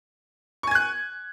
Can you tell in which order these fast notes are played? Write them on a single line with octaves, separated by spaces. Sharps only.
C#6 G#5 G#6 F#6